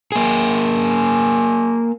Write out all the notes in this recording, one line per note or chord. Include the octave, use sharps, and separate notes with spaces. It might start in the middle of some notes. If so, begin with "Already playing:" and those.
A#3 G#4